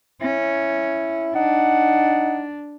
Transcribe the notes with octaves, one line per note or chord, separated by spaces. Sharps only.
C#4 E4
D4 D#4 F#5